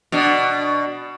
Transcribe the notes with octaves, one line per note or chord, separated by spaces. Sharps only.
B2 D4